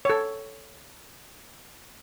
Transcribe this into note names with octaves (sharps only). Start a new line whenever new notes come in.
A4 C#5